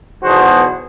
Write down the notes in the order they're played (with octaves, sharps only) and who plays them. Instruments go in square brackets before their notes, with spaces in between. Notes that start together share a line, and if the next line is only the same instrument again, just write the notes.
[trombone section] B1 E2 B2 F#4 G#4 C5